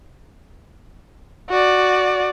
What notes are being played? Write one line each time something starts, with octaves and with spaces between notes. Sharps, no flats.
F#4 D5